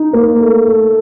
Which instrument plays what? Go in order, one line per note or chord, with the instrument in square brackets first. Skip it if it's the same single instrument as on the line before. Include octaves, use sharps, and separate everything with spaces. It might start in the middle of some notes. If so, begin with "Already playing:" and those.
Already playing: [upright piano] D#4
A#3
A3
A3